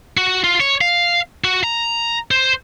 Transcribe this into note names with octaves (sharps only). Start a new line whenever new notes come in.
F#4
F4
C#5
F5
F#4
A#5
C5